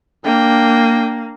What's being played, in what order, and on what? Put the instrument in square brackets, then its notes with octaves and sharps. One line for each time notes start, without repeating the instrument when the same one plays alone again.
[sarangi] A#3 [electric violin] D4 G5